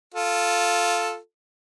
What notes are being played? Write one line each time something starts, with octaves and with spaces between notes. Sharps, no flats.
F4 A4